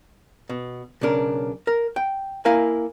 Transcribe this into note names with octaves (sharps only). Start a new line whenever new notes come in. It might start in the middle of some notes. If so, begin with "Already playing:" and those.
B2
B1 C#3 D4 A#4
A#4
G5
A#3 E4 A#4 F5 G#5